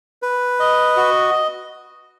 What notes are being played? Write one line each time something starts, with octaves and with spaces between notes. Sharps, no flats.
B4
D#5
F#4